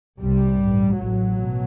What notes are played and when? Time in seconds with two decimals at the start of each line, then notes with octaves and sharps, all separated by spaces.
0.20 C2 C3 G3
0.60 A1 G2
0.98 A1 A2 F#3
1.36 B2